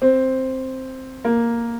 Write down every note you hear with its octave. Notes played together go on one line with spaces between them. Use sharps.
C4
A#3